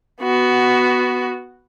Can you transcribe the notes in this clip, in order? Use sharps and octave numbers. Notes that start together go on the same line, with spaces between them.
B3 F#4